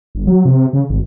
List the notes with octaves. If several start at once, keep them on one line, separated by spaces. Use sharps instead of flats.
G1
F#3
C3
C#3
G#1